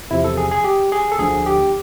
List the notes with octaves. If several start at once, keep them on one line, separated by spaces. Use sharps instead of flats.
E2 C3 F3 E4
A4
G#4
G#4
G4
G#4
A4
D2 D3 F3 G#4
G4